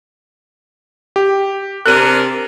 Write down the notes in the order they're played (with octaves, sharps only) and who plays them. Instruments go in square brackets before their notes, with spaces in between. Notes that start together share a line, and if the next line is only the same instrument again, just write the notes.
[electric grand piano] G4
[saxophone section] C3 D4 A#4 [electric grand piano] F#6 D#7